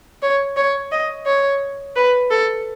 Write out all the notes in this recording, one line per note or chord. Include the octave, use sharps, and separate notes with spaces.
C#5
C#5
D#5
C#5
B4
A4